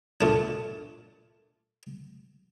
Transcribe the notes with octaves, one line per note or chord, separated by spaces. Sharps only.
A#2 A3 D4